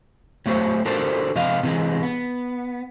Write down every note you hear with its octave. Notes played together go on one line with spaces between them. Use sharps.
F#3 A3 G4 C5 C#5
D4 F#4 G4 A4 A#4 C5
C3 F3 D#5 F5
C3 E3 F#3 G#3
B3